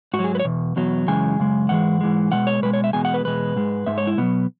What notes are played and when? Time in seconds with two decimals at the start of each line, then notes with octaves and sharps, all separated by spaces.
0.13 G#2 F#4
0.19 F#3
0.24 G#4
0.35 B4
0.39 C#5
0.45 E2 B2
0.76 E2 B2 F#3
1.07 F#2 C#3 E3 G#3 G#5
1.39 F#2 C#3 G#3
1.69 G#2 E3 G#3 F#5
2.01 G#2 E3 G#3
2.32 B2 G#3 F#5
2.47 C#5
2.62 B2 G#3 B4
2.73 C#5
2.84 E5
2.93 E2 B2 G#3 G#5
3.05 F#5
3.14 B4
3.24 E2 B2 G#3 B4
3.56 G#2 G#3
3.86 G#2 G#3 E5
3.98 C#5
4.07 E4
4.18 B2 F#3 B3